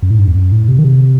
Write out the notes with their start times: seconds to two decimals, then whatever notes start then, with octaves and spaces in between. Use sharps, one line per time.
0.02 F#2
0.11 A2
0.19 G2
0.28 E2
0.35 F#2
0.52 A2
0.68 C3
0.79 D#3
0.85 C3